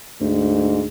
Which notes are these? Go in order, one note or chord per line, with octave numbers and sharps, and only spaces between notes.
D2 G#2